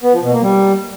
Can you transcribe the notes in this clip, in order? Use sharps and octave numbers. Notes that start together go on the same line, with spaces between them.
B3
F3
B2
A#3
G3